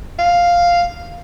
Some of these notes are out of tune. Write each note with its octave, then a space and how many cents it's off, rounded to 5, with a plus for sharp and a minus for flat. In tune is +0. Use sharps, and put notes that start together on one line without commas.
F5 +0